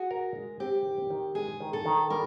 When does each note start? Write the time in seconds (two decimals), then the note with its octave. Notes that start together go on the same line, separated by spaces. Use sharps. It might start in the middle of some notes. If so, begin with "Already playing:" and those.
Already playing: F#4 G#4
0.11 A#4
0.36 G#3
0.60 C4 G4
0.86 D#3
1.10 D#3
1.35 G#3 G#4
1.60 D#3
1.73 A4
1.86 D#3
2.10 G3 A#4